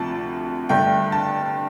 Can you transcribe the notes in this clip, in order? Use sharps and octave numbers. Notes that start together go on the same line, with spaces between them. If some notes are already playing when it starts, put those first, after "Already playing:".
Already playing: D2 C3 F3 A5
G2 D3 A3 G5
A5